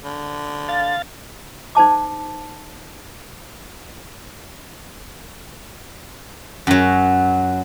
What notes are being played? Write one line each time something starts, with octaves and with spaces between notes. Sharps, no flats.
D3
F5 A6
D#4 C5 A5 D6
F#2 F#3